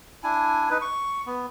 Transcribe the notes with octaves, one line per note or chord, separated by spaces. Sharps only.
D4 E4 G#5
D#4 B4
C#6
B3